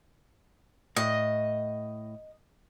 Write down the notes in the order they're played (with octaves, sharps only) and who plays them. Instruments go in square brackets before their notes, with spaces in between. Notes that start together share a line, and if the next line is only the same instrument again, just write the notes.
[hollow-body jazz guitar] A2 [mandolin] D#5